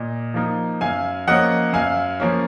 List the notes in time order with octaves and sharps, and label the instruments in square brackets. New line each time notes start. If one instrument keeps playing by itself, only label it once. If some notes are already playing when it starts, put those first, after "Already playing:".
Already playing: [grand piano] A#2 D#5
F3 A#3 D#4
F#2 F5 G#5
F3 A#3 C#4 D#5 F#5
F#2 F5 G#5
F3 A#3 C#4